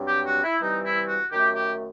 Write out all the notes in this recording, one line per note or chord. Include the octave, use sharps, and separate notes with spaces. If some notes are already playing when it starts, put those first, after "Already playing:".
Already playing: G2 F#3 C4
G4
F#4
E4
C3 E3 G3 C4 D#4
E4
F#4
F#2 D#3 A3 G4
G4